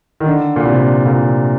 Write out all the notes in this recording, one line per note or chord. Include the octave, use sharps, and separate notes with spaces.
D#3
D3
A#2
C3
A#2